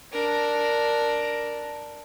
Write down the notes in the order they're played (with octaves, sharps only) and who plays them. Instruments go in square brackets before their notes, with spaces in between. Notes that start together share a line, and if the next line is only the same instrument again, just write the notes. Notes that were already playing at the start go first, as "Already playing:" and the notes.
[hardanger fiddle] D4 A#4